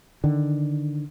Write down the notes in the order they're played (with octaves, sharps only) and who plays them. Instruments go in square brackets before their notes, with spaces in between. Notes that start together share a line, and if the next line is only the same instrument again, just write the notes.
[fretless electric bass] D3 D#3